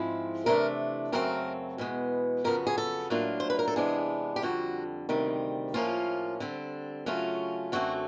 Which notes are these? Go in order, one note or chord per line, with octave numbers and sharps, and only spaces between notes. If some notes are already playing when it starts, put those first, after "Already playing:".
Already playing: G#2 F3 G#3 C4 E4
C3 E3 A3 D4 A#4
F#2 C#3 F#3 A3 C4 A#4
E2 B2 G#3 B3
F2 C#3 F#3 B3 A#4
G#4
A4
A2 F#3 A#3 D4 F4
C5
B4
A#4
A4
C3 E3 G#3 B3 D4 G#4
G4
F2 D3 G3 F#4
D2 C3 D#3 G3
A2 F3 A#3 C#4 F4
D3 G3 C4
C#3 F#3 A3 C#4 F4
F#2 D3 F#3 A3 C4 F#4